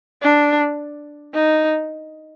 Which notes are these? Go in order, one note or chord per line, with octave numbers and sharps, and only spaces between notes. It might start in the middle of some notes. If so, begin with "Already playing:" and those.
D4
D#4